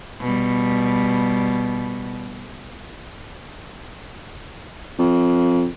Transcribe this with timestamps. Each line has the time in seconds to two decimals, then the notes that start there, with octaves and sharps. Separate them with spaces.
0.20 B2 G3
4.98 F2